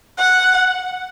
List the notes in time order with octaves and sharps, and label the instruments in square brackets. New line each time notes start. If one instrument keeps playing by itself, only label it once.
[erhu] F#5